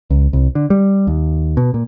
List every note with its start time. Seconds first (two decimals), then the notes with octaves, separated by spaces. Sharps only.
0.10 C#2
0.33 C2
0.55 D3
0.70 G3
1.07 D#2
1.57 B2
1.74 A#2